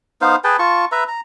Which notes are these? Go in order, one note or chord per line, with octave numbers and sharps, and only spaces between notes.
B3 D#4 C5 F5
G#4 B4 G5 A5
F4 A5 C#6
B4 E5 A#5
A#5